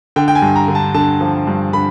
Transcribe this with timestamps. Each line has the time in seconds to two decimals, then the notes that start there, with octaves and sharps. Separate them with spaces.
0.16 D3 G5
0.28 G5
0.35 G#5
0.42 G2
0.56 A#5
0.68 D3
0.75 A5
0.94 D3 A5
1.21 F3
1.47 G2
1.73 D3 B5